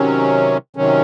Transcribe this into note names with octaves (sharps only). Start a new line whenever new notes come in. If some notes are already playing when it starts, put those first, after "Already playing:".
Already playing: C3 D#3 F#3 C#4
C3 D#3 F#3 C#4